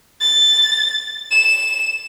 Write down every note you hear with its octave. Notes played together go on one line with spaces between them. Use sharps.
A6
E7